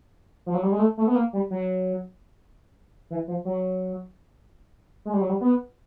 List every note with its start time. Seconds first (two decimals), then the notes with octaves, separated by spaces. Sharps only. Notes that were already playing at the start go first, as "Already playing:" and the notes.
0.46 F3
0.55 F#3
0.63 G3
0.72 G#3
0.79 A3
0.97 A3
1.07 B3
1.15 A#3
1.33 G3
1.50 F#3
3.10 E3
3.28 F3
3.45 F#3
5.05 G#3
5.14 G3
5.21 F#3
5.29 G3
5.41 B3